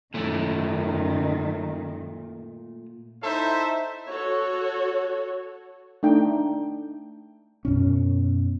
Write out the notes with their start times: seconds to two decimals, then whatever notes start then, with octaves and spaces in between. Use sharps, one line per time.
0.14 F#2 A#2 D#3 A3
3.23 D#4 E4 A4 C5 E5
4.10 F#4 A4 C#5
6.03 A3 D4 D#4 G5
7.65 F#2 B2 C#4